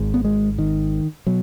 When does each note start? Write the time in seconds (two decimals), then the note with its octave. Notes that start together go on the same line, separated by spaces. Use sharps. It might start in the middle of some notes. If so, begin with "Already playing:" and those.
Already playing: G#1 G#2
0.14 B3
0.25 G#3
0.59 D#3
1.27 B2 F#3